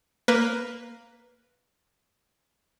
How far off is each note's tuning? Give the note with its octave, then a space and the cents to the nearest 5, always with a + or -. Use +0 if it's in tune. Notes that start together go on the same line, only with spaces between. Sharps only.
A#3 +0 B4 +0